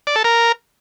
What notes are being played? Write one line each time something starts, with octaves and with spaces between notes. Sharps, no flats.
D5
A4
A#4